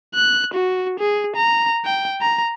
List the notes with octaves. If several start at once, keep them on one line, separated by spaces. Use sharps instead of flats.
F#6
F#4
G#4
A#5
G5
A#5